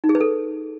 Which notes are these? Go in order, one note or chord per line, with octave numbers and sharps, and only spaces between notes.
D#4
G#4
B4
A4